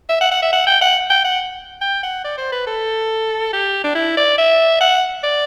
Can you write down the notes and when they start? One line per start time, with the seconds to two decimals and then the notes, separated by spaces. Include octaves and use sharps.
0.09 E5
0.21 F#5
0.31 F#5
0.42 E5
0.53 F#5
0.67 G5
0.81 F#5
1.10 G5
1.24 F#5
1.81 G5
2.03 F#5
2.24 D5
2.38 C5
2.52 B4
2.67 A4
3.53 G4
3.84 D4
3.95 E4
4.17 D5
4.38 E5
4.81 F#5
5.23 D5